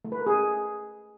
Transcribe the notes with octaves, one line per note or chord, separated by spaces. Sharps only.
A3
B4
A#4
G#4